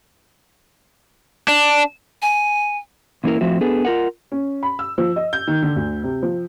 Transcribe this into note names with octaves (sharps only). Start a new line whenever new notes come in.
D4
G#5
A#2 E3 A#3 C#4 E4 A#4
A2 F3 C4 F#4 E5
B3 D4 G#4 A4 B4
F4 A#4 F#5
C#4
B5
E6
F3
D#5
G6
D#3
D3
D2
C3
F3